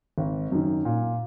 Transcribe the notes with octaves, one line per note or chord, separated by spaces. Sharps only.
G#1
F#2 D#3
A#2